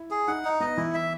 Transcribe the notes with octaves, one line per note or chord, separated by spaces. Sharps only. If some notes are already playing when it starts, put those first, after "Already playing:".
Already playing: E4
G#4
D#4 F#5
D#4
B3 D#5
E3 E4
E5